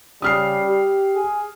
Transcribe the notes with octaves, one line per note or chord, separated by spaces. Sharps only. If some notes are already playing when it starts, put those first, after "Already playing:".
C#3 G3 D#6 F6 C7
G4
G#4